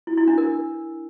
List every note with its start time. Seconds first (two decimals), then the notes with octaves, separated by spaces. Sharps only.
0.07 E4
0.17 E4
0.28 D4
0.38 A#4